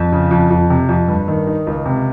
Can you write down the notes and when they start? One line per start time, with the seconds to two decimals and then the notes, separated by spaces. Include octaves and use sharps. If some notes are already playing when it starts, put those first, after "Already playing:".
Already playing: F2
0.12 C#3
0.31 F2
0.50 F2
0.70 C3
0.89 F2
1.08 G2
1.28 D#3
1.47 D#4
1.67 C#2
1.86 C3